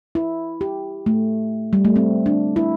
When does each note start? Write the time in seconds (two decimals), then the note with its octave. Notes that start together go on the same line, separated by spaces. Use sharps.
0.15 E4
0.61 G4
1.06 A3
1.73 G3
1.85 A3
1.96 C4
2.26 D4
2.56 E4